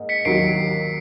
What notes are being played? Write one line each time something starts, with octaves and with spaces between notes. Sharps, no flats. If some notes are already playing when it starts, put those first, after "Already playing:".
Already playing: G#2 A#3 D#4
B6 C#7
D#2 D#3 F#3 C7 D7